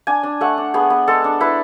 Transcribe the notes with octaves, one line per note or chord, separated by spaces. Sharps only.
D4 G#5
D4
A3 F#5
D4
B3 G#4
B3
G#3 A4
D4
E4 B4